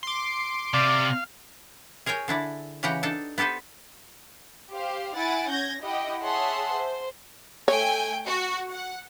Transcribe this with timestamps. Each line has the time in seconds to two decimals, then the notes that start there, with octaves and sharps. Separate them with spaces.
0.03 C6 D6
0.74 C3 D5 F5
2.06 G#4 A#4 C#5 G5 G#5
2.28 D3 D4 E4 D5
2.83 C#3 E3 G4 F#5 G5 A#5
3.03 D4 D#4 A4 A5
3.38 B3 G4 A4 B4 C5
4.70 G4 C5 F5
5.16 E4 F#5 G#5 A6 D7
5.48 C#4 G6 G#6 A#6
5.81 E4 G4 D#5 F#5 G5
6.22 G#4 C#5 E5 F#5 A5 C6
6.72 C5
7.68 A3 C#5 G5 G#5
8.27 F#4
8.71 F#5